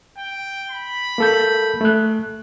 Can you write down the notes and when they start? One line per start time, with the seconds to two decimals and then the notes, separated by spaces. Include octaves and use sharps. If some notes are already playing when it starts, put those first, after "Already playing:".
0.18 G5
0.71 B5
1.18 A#3 A4 G6
1.81 A3 F#6